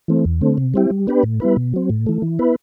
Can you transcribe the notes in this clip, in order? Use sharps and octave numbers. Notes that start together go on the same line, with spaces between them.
E3 A3 C4
E2
D3 A3 C4
C3
G3 C4 E4 G4
G3
B3 D4 G4 B4
A2
G3 B3 E4 B4
B2
F#3 C4
A2
E3 A3
E3
B3 E4 B4